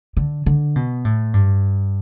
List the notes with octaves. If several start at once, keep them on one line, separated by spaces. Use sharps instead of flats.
D3
D3
B2
A2
G2